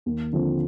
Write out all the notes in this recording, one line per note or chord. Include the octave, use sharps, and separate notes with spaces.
D#2
D3 F3 C4